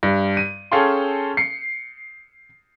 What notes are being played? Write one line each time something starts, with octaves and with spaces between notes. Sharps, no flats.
G2
D#7
C#4 G#4 A4 F5 G5 C6
C7 C#7